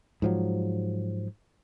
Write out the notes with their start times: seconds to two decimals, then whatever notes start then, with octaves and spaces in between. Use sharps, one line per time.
0.22 G#2 F3 F#3